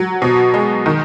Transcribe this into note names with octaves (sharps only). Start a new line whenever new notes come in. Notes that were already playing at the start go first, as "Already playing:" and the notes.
Already playing: F#3
B2
G#3
D#3